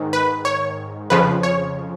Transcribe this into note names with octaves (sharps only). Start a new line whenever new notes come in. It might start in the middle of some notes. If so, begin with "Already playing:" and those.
Already playing: G#2 D#3
B4
C#5
F2 C#3 F3 B4
C#5